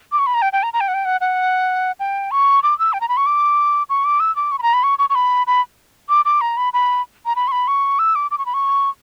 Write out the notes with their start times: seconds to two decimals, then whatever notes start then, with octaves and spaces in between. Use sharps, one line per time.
0.12 D6
0.19 C#6
0.27 B5
0.34 A#5
0.42 G5
0.53 G5
0.63 A#5
0.73 A#5
0.81 G5
0.88 F#5
0.94 G5
1.05 F#5
1.21 F#5
2.00 G5
2.31 C#6
2.63 D6
2.79 E6
2.93 G5
3.01 A#5
3.09 B5
3.17 C#6
3.26 D6
3.89 C#6
4.05 D6
4.20 E6
4.36 D6
4.52 C#6
4.59 B5
4.63 A#5
4.74 B5
4.83 C#6
4.99 C#6
5.10 C#6
5.15 B5
5.47 B5
6.09 D6
6.25 D6
6.41 A#5
6.57 B5
6.73 B5
7.26 A#5
7.36 B5
7.48 C#6
7.52 B5
7.68 C#6
7.99 E6
8.15 D6
8.31 D6
8.38 C#6
8.46 B5
8.54 C#6